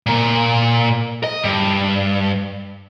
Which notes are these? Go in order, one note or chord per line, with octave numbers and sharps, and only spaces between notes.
A#2 A#4
D#5
G2